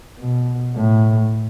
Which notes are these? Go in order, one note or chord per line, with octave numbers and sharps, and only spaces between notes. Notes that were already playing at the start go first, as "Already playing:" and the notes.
B2
A2